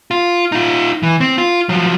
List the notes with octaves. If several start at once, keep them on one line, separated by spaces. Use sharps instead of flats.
F4
D#4 F4
E3
C4
F4
F3 F#3